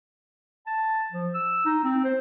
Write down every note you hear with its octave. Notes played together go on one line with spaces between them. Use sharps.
A5
F3
E6
D#4
C4
C5